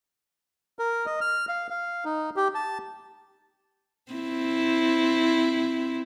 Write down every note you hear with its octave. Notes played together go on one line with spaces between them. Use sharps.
A#4
D#5
F6
F5
F5
D#4
G4
A5
C4 E4